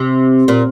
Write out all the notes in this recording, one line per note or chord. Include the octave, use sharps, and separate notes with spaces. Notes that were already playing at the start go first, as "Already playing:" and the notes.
Already playing: C3
A#2